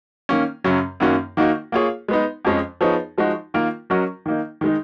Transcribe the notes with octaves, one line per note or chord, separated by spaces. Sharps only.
D#3 A#3 C#4
F#2 C#3 F#3 C#4
F#2 D#3 A#3 C#4 F#4
D#3 A#3 D#4 F#4
A#3 F4 G#4 C#5
G#3 B3 D#4
F2 F3 G#3 C#4
F3 B3 D#4 G#4 C#5
F3 G#3 D#4 F#4
D#3 A#3 F4 A#4
F#3 C#4 F#4 A#4 D#5
D#3 A#3 D#4
D#3 G#3 D#4